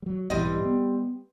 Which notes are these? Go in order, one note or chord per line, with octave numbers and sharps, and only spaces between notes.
F#3 G3
B1 G#2 E3 G3 C4 D#5
B3